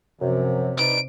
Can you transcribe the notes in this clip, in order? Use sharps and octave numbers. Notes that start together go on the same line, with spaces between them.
F#2 C3 F3
D#4 B4 D5 D7